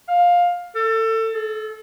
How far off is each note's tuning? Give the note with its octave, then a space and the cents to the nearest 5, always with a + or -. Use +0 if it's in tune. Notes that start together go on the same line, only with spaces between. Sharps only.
F5 +15
A4 +25
A4 -35